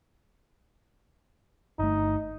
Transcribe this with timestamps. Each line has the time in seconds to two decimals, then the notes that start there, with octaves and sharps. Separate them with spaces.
1.79 G1 A3 D#4